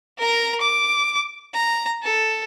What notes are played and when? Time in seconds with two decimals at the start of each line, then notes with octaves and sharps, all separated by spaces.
0.18 A#4 A#5
0.61 D6
1.54 A#5
2.03 A4